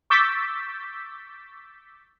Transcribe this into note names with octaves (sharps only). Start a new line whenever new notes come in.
C#6 D6 E6 G6 A6 B6